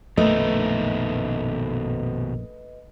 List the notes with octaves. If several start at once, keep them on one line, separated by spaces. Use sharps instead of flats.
A#1 F#2 B2 D#3 A3 D#4 B4 D#5